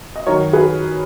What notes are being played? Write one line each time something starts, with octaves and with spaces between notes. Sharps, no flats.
D#5
F#2 D#3 F#3 A#4 C#5
G#4 B4